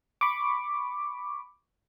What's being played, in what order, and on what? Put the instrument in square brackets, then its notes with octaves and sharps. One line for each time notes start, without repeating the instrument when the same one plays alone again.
[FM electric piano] B5 C#6 D6